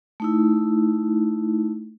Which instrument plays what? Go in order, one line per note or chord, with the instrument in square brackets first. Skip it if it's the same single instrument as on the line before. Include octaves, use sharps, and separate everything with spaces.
[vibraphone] A3 D#4 E4